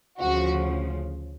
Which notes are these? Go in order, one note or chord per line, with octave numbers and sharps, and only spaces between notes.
D2 C#3 F3 F#4